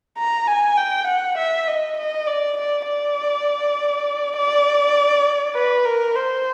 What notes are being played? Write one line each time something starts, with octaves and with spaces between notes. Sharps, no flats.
A#5
G#5
G5
F#5
E5
D#5
D#5
D5
D5
D5
D5
B4
A#4
C5